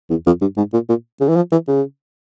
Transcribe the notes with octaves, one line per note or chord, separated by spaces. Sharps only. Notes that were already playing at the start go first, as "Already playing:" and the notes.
E2
F2
G2
G#2
A#2
A#2
C#3
E3
F3
E3
C#3